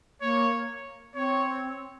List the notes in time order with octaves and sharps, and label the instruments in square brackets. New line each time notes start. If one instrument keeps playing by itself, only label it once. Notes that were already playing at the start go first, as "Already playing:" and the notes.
[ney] A#3 [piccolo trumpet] C#5
[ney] C4 [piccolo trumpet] C#5